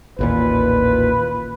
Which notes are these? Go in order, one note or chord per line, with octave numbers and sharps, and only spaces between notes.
A1 D#2 A#2 F4 B4